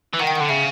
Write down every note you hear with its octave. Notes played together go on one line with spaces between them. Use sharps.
E3
D#3 F#5
G5
F#5
D3
C#3 E5